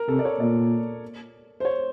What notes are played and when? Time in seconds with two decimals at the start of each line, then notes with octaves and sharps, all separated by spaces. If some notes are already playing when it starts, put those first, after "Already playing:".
Already playing: A#4
0.08 C3 A4
0.19 D5
0.25 C#5
0.40 A#2 D5
1.60 C5
1.65 C#5